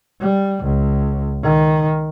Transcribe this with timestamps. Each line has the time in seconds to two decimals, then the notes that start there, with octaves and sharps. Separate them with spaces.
0.21 G3
0.64 C#2
1.42 D#3